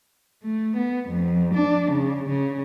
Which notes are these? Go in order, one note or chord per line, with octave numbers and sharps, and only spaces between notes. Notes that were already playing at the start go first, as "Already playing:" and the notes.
A3
B3
F2
D4
C#3
C#3